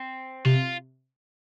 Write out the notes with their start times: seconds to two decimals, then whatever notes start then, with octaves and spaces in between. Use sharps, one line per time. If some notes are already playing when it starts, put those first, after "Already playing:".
Already playing: C4
0.45 C3 F4